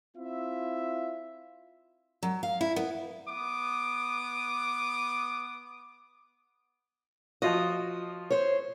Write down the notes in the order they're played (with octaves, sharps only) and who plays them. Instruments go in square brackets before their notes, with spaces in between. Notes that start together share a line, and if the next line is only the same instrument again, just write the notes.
[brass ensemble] C4 E4 F4 E5
[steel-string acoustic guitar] F#3
F5
E4
B3
[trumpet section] B3 D6 D#6
[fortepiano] F3 F4 F#4 [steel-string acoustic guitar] D#5
[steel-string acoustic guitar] C5 C#5